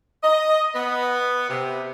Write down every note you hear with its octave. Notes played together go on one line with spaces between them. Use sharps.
D#5
B3
C3